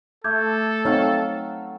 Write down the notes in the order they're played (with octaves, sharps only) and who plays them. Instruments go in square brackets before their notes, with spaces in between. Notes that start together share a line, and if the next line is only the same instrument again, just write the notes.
[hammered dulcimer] A3 [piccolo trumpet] A4 [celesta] D6 G6 G#6
[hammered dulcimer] F#3 F5 G5 [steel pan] C4 D#4 C#5